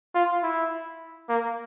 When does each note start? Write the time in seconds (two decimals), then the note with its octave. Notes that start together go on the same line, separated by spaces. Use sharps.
0.15 F4
0.43 E4
1.29 A#3